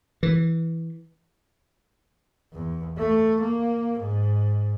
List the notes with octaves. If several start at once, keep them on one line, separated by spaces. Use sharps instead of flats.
E3
E2
A3
A#3
G#2